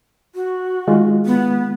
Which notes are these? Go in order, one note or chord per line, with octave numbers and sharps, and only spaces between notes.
F#4
D#3 G#3 F4
B3